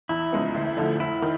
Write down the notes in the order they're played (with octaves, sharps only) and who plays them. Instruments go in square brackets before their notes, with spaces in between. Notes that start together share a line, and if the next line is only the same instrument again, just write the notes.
[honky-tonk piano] E2 [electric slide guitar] E4
[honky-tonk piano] C#3 F3 G#3 B3
D2
D3 F3 A3
[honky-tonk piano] F1 [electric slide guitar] E4
[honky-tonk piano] D#3